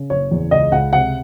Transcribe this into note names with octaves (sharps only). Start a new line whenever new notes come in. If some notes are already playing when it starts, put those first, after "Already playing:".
Already playing: C#3
F#1 C#5
E2
C#2 D#5
C#2 F#5
C3 F#5